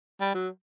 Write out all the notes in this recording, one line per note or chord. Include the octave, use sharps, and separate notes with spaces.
G3
F#3